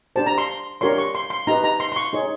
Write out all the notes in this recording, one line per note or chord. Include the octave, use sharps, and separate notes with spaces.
D4 G4 C5 A5
A#5
C6
D4 G4 A#4 C#5 C6
C#6
C6
C6
D#4 G4 B4 A#5
A#5
C6
C6
C#6
D#4 G#4 C#5